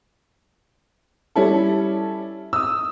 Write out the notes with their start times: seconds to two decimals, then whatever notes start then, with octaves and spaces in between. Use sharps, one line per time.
1.36 G3 C#4 E4 A4
2.53 D#6 E6